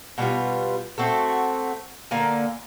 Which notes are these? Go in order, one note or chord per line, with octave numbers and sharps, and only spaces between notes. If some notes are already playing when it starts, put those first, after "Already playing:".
B2 G3 B3 F4
A3 C4 F#4 A4
D3 A#3 D5 G#5